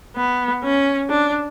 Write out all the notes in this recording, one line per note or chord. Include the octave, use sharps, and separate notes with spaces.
B3
C#4
D4